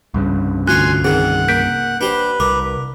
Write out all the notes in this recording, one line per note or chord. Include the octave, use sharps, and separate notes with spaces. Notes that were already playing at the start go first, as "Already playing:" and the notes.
C2 G2 C#3
D2 F4 G#5 C6 C#6 F#6
D#3 C4 G#4 F#5
A#3 G6 B6 D7
D4 G4 B4 C5
C2 A#4 D6